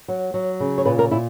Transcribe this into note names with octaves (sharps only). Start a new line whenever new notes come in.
F#3
F#3
C#3
C#5
A#2 B4
A#4
A#2 E4